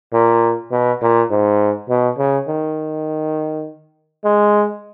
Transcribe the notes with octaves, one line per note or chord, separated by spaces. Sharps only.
A#2
B2
A#2
G#2
B2
C#3
D#3
G#3